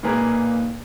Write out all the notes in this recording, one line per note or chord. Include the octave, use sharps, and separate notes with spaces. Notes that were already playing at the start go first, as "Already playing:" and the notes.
A#2 D#3 A#3 G#4 B4 A#5